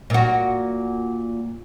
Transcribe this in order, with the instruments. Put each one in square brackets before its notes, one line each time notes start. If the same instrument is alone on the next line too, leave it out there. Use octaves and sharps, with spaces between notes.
[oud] A#2 F#4